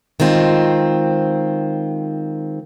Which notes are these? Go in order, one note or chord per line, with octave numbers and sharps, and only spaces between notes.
D#3 G#3 C4 F4